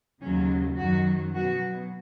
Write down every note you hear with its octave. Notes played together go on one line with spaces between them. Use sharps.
D#2 C#3 F#3 C#4
F#2 D#3 F#3 F#4
B2 F#3 F#4